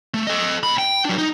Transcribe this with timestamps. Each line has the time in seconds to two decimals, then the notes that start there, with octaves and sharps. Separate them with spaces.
0.14 A3
0.27 A4 D#5
0.63 A2 B5
0.78 G5
1.05 F#3 D4
1.18 D#4